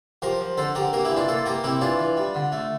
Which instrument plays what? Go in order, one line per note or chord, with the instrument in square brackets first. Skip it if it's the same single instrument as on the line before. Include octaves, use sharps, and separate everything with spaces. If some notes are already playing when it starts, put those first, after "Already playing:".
[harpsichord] F3 G4 A#4
F3
D3 A4 C5
D3 G4 A#4
A#3 G4 A#4
E4 G4
E3
D4 F4
A#3 F4 A4
A#3 G4 A#4
C3 E4 G4
E3 D4 F4
E3
G3
D3
A3